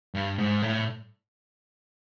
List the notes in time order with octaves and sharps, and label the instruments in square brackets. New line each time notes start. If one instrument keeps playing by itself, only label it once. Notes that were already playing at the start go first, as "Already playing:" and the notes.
[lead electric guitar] G2
G#2
A2